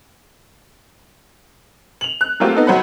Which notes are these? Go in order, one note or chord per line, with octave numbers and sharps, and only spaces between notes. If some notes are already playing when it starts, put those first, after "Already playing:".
F7 F#7
F#6
F#3 A3 A#3 C4 F4 G4
B3 D#4 A4
C#2 F#3 C5 F#5 B5